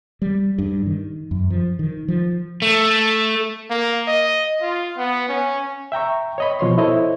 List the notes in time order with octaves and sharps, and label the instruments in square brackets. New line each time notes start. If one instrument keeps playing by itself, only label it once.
[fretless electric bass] G3
G2
D#3
F#2
F3
D#3
F3
[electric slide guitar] A3
[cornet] A#3
D#5
F4
B3
C#4
[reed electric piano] E5 G5 A#5 C#6
C#5 D#5 B5
B2 F3 C#5 C6
E4 A4 C5 C#5 D#5